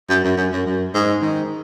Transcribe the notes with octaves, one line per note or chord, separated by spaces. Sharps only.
F#2
F#2
F#2
F#2
F#2
G#2
D#3